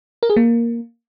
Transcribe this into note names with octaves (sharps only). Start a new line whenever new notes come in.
A#4
G#4
A#3